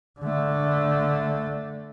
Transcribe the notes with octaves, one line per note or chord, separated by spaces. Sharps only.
D3 A3